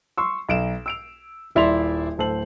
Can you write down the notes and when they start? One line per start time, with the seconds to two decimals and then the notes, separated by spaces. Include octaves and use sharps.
0.18 C6 C#6 E6
0.49 B1 D7 E7
0.86 E6 D7 F7
1.55 D#1 E4 D5 E5 C6 F7
2.18 D1 A2 A4 C5 F#7